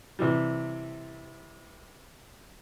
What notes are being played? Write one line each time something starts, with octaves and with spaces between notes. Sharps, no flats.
C3 E3 G3